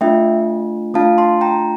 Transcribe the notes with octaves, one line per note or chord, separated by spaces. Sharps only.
A3 D4 F4 E5 G5
A3 D4 F4 F5 A5
A5 C6
G5 A#5